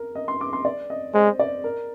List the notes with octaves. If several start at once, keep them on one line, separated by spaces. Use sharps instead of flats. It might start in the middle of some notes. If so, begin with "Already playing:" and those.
Already playing: A#4
D#5
C6
D6
C6
D5
D#5
G#3 C5
D5
A#4